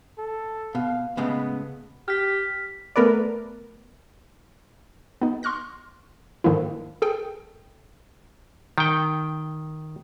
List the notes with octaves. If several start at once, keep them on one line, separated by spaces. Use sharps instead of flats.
A4
B2 F5
A2 C#3 G#3 B3
G4 F6 B6
A3 B3 A#4 B4 D5
B3 D#4
C6 C#6 F6 F#6 A#6
G#2 D3 D#3 F3 A#3 E4
G#4 A4 G5
D#3 G5